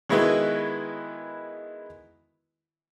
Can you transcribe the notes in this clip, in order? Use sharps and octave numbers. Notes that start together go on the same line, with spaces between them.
D#3 G#3 B3 E4 F#4 B4